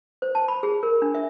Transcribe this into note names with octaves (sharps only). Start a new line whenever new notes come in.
C5
A5
B5
G#4
A#4
D4
E5